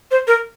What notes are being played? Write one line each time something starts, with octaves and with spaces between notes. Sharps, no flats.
C5
A#4